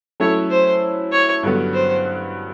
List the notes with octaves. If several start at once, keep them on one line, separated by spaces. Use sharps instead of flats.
F#3 A3 C#4 E4 A4 C#5
C5
C#5
G2 D3 F#3 B3
C5